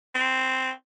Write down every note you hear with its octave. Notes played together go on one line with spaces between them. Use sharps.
C4